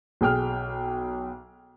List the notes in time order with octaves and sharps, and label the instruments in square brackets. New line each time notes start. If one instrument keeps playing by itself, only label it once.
[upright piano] B1 G#4 G5 F6